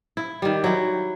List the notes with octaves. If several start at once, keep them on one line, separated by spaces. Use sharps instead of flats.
E4
D#3 G3
F#3 E4